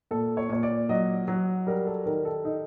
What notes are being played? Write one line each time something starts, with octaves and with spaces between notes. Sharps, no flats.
A#2 A4
C#5
A#2 C#5
D5
F#3 D#5
F#3
G3 A#4
A4
D#3 A#4
A4
D#4